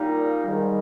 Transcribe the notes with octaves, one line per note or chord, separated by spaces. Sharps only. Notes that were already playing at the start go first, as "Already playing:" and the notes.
Already playing: A#2 G3 A#3 D#4
G#2 D#3 G3